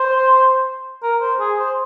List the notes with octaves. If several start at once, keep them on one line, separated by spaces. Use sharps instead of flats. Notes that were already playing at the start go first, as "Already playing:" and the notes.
Already playing: C5
A#4
C5
G#4
C5